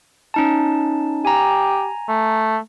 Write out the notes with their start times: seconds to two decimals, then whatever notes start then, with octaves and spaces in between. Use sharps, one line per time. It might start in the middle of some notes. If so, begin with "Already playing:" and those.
0.34 C#4 D#4 A5
1.25 G4 G#5 A#5
2.08 A3